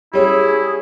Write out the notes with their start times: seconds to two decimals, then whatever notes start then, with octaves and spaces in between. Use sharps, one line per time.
0.13 G3 C#4 E4 G#4